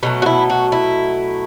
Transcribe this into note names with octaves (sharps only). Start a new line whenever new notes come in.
B2 F#3 A3 B3
F#4
E4
F#4
E4